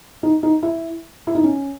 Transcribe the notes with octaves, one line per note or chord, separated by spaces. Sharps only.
D#4
D#4
E4
E4
D#4
C#4